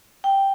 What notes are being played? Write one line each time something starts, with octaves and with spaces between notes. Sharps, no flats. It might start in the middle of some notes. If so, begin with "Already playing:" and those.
G5